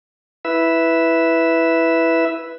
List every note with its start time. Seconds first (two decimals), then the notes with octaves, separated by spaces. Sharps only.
0.45 E4 B4 E5